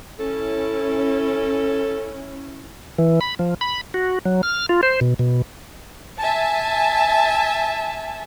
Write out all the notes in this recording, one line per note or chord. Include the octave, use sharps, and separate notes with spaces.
C#4 E4 A4
E3
B5
F3
B5
F#4
F#3
F6
F4
C5
B2
B2
E5 G#5 A5